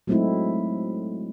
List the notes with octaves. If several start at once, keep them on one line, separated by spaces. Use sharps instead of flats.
F#3 G#3 A3 C4 D#4 E4